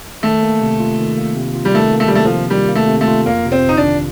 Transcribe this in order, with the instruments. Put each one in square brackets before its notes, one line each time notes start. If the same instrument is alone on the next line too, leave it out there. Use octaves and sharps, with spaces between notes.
[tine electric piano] D#3 [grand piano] A3
[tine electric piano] A#3
C3
F4
D#3
A#3
C3
F4
[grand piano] G3
[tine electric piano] D#3 [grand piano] A3
[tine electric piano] A#3
[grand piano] A3
G3
[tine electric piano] C3 [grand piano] A3
[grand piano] F3
[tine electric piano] F4
[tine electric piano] D#3 [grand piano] G3
[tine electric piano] A#3
[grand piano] A3
[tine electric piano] C3
[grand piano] A3
[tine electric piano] F4
[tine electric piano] F2 [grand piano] A#3
[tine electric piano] C3
[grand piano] C4
[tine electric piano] G1 [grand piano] D#4
[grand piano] D4
[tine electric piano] D#3